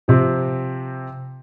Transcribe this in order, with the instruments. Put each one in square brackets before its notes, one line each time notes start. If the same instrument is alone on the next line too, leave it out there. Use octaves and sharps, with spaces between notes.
[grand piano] C3 F3 C4